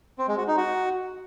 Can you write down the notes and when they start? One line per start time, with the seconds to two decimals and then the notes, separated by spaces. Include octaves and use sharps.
0.18 C4
0.28 G#3
0.38 F#4
0.47 D#4
0.57 F#4